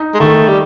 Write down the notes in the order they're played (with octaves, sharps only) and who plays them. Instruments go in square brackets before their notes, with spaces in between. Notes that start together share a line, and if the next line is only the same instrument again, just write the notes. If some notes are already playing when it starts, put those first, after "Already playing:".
Already playing: [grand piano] D#4
[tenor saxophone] G#3
[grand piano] D#3 [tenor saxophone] A3
[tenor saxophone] G3